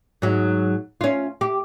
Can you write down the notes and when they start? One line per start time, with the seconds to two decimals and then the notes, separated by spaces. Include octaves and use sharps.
0.22 G#2 F#3
1.01 C#4 F4
1.41 G4